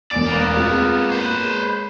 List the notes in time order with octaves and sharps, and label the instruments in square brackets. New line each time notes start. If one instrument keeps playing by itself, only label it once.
[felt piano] E1 G#5 D7 [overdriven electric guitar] D5
[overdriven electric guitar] A#3 B3
[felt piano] G#3 C4 F4
[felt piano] A#3 [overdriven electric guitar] B4 C5
[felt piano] G#3